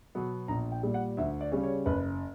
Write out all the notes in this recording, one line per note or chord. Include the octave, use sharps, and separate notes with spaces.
B2 F#3 B3
A#1 A#5
G5
A#2 G3
F#5
D2 E5
D5
C#3 G3 C#4
C#5
F#1 B4